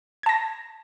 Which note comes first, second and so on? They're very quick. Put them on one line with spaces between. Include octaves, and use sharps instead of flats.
G#6 A5 A#6